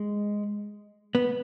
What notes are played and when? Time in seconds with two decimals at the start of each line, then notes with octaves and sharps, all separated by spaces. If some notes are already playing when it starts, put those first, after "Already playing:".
Already playing: G#3
1.15 B3